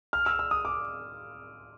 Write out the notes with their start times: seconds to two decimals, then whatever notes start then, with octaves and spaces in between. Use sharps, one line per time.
0.13 F6
0.26 E6
0.39 E6
0.51 D#6
0.65 D6